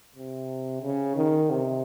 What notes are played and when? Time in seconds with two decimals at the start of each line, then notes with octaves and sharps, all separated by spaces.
0.16 C3
0.82 C#3
1.15 D#3
1.50 C3